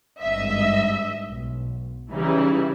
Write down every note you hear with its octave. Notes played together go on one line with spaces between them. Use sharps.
G#1 G2 D#5 E5
B1
C#3 E3 G3 D#4 E4